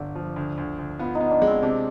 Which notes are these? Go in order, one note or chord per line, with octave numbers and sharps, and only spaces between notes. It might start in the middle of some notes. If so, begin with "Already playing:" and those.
Already playing: G1 D3 D5
F3
D2
D2
D2
B3 F4
D#4
B3
D4
G#3
C4
C3 D4